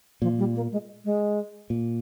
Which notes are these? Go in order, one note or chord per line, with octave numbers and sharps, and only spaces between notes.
A#2 F3
G3
A#3
G#3
G#3
A#2